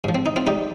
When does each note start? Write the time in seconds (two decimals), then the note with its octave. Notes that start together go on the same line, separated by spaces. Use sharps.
0.04 G2 F3
0.15 C4
0.26 D#4
0.36 C4 F4
0.47 G3 D#4 G4